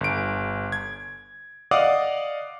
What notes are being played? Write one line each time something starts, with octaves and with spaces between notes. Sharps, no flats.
G1 D7
G#6
D5 D#5 F5 F#5 D6 D#6